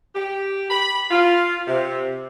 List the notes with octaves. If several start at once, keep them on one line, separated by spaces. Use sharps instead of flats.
G4
B5
F4
C3